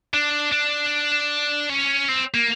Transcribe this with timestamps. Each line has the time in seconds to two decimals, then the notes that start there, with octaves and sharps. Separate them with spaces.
0.14 D4
0.52 D4
1.70 C#4
2.09 C4
2.34 A#3